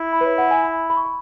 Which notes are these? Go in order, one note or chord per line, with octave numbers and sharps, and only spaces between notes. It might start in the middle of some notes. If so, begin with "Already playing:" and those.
Already playing: E4
B5
B4
C#5
F#5
G#5
B5
B5
C#6
B5